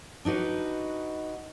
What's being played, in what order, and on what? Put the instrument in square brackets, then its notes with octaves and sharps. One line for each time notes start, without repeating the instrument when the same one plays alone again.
[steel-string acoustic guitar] D4 D#4 F#4 B4